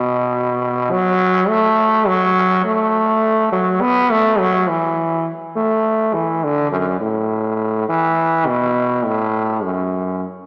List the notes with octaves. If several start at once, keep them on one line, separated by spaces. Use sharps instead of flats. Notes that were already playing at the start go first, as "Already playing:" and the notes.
Already playing: B2
F#3
A3
F#3
A3
F#3
B3
A3
F#3
E3
A3
E3
D3
F#2
A2
E3
B2
A2
F#2